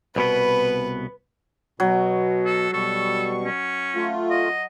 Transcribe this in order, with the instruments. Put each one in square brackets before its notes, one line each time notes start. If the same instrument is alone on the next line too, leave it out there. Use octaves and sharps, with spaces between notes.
[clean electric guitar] C2 B2 B3 [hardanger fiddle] B4
[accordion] B2 [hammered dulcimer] F#3
[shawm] A4
[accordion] B2 G3 C#6 [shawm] A4
[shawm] C#4
[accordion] A3 F4
[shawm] D#5